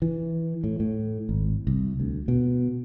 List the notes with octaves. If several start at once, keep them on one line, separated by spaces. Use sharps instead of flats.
E3
A2
A2
G#1
C2
D2
B2